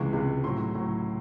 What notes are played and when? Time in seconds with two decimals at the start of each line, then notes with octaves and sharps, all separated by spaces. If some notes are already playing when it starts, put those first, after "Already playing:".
Already playing: C#2 C3 E3 G#3 C#6
0.13 C#2 C3 E3 G#3
0.44 A2 F#3 C6
0.75 A2 F#3